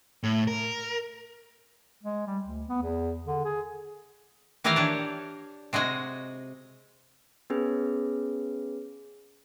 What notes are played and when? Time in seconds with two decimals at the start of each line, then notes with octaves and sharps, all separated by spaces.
0.23 A2
0.47 A#4
2.03 G#3
2.27 G3
2.45 D2
2.68 B3
2.82 E2
3.26 D3
3.45 G#4
4.64 D#3 E3 D#4 G4 D#5 F5
4.76 D4 C#5
5.73 C3 G#3 F#4 D#5
7.50 B3 C#4 G#4 B4